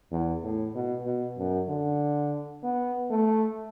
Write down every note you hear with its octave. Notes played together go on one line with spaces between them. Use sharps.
E2
A2
B2
B2
F#2
D3
B3
A3